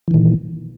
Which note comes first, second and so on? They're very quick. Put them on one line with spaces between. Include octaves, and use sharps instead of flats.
E3 D#3 A#2